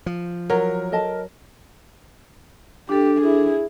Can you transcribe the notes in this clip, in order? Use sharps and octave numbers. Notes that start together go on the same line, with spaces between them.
F3
F#3 A#4
A4 D#5 A5
D4 G4 A4
E4 G#4